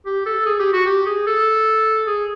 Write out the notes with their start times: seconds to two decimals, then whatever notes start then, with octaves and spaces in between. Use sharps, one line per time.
0.05 G4
0.26 A4
0.46 G#4
0.59 G4
0.73 F#4
0.86 G4
1.06 G#4
1.27 A4
2.07 G#4